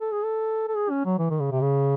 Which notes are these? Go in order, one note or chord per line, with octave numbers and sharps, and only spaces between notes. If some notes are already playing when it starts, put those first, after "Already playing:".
A4
G#4
A4
A4
G#4
C#4
F#3
E3
D#3
C#3
C3
C#3